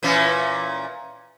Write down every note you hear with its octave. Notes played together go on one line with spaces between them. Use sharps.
A#2 E3 C#4